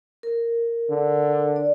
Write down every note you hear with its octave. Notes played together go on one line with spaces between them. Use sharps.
A#4
D3
D5